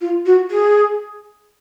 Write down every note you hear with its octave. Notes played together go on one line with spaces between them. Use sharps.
F4
F#4
G#4